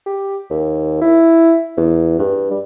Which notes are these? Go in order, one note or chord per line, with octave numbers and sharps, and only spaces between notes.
G4
D#2
E4
E2
G2
G3